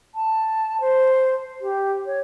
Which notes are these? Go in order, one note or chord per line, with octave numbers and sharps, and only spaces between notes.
A5
C5
G4
C#5